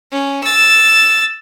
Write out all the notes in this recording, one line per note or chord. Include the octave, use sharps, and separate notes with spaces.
C#4
E6 A6